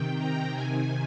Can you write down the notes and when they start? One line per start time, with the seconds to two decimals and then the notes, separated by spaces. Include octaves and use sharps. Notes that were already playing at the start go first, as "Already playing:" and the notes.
Already playing: C3 D#3 G5
0.18 A#5
0.52 C3 D#3 G#5